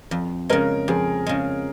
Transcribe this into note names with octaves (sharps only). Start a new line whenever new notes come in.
F2
C#3 G#3 A#4
F2 G#4
C#3 G#3